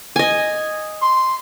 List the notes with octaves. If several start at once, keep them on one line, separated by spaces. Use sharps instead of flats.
D#5 G#5
C6